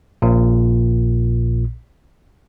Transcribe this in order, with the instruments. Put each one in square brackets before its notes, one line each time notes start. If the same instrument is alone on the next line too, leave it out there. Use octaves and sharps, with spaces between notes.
[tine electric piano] A#1 A#2